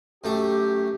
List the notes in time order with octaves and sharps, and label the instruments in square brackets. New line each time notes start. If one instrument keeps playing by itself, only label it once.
[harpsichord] F#2 A3 E5 [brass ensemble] G4